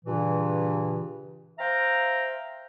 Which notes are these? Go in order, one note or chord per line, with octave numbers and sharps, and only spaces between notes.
G2 A#2 C#3 E3
C5 E5 F5 G5 A#5